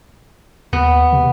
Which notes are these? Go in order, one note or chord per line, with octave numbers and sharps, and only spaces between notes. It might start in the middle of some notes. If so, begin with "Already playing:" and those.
D#2 B3
C3